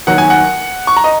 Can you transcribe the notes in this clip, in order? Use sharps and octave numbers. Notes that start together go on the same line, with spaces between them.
D#2 D#3 F#3 F#5
G#5
F#5
C#6
A#5
D#5